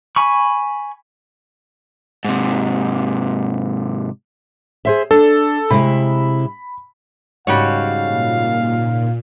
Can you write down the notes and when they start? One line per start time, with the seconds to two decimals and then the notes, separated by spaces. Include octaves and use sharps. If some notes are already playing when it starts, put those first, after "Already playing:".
0.16 G#5 B5 C#6
2.25 G#2 C3
4.85 G#4 C5 E5
5.11 D4 A4
5.71 C3 G#3 E4 B5
7.47 G#2 C#3 G3 F#4 C#5 F5
8.05 A#2